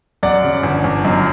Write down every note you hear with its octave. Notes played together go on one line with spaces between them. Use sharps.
F#2 D5 F#5
C#3
G1
G1
F#2